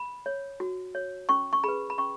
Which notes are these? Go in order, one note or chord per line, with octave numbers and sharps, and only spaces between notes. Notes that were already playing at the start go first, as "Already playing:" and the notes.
Already playing: B5
C#5
F#4
C#5
C#4 C#6
C#6
G#4 B4 B5
B5
C#4 C#6